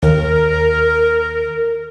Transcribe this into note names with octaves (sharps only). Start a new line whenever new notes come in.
D#2 A#4